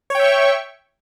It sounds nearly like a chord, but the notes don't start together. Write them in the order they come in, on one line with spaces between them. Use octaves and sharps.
C#5 G5 E5 C#6